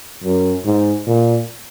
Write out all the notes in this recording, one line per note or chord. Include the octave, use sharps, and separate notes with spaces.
F#2
G#2
A#2